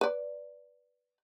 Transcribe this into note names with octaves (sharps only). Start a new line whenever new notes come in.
B4 D5